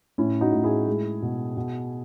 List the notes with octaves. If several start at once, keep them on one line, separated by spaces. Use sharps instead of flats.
A2 C#4 E4
D#4 F#4
A2
E4 G#4
G#3
B2
B2